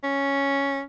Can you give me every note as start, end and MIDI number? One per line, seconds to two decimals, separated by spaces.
0.04 0.82 61